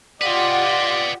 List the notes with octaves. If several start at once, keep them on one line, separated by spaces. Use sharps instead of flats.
F4 G4 B4 D5 D#5 F#5